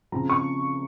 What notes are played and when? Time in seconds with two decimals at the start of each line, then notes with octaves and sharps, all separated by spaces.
0.12 C#3 F3 C4 A#5
0.30 C#6